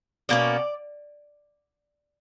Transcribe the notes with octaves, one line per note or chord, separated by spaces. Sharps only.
B2 A#3 C#4 D5